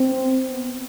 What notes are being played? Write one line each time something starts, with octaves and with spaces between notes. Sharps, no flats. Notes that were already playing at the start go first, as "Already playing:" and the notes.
Already playing: C4
B3